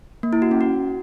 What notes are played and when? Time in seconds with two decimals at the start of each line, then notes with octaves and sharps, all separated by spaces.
0.23 A#3
0.33 E4
0.42 F#4
0.51 C#4
0.61 F#4